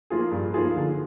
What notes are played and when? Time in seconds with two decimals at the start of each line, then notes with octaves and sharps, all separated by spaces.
0.10 F3 A#3 F4 G#4
0.31 G2
0.54 F3 A#3 F4 G#4
0.76 D3